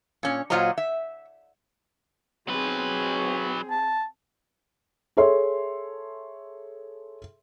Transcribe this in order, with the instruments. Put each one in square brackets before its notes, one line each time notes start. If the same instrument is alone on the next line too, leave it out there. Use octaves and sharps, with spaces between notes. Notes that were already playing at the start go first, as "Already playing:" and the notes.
[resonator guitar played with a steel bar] A#2 C#4
A#2 F#3 F4 C5 D#5 A#5
E5
[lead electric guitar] F#3 B4 [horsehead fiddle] C4 G#4
[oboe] A5
[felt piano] G#4 A4 C#5 E5 C6